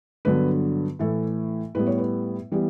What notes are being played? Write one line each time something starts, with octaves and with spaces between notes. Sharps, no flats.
G2 D3 F#3 B3 B4
A2 E3 A3 A4
A2 G3 B3 B4
C#5
B4
E3 G3 B3